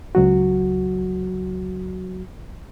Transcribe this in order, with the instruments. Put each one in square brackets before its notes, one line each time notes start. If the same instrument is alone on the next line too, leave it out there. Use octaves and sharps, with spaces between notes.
[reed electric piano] C#2 F#3 F#4